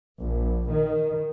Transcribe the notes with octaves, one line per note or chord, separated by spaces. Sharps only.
A#1
D#3